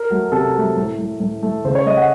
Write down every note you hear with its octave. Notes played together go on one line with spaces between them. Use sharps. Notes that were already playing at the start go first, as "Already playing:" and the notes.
Already playing: A#4
F#3 A3
C3 A4
F#3 A3
A2
A3
A2
A3
C#3 C5
C#5
A3 D#5
F#5